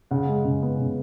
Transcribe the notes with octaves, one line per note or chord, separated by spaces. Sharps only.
C#3 F#5
G#3
C#3
B3
C#3